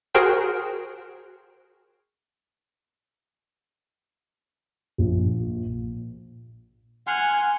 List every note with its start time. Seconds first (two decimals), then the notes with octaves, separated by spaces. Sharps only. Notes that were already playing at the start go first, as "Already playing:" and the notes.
0.15 F#4 G#4 A#4 C5 G5
4.98 A#1
7.07 F#5 G#5 C6 F6